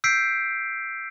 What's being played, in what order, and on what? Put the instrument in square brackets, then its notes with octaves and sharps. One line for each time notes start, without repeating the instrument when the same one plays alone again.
[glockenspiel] E6 G6 B6 C7 D7